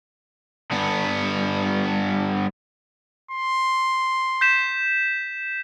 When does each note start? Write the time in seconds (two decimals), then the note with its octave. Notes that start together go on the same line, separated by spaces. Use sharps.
0.72 G2 B3
3.31 C6
4.41 G6 B6 E7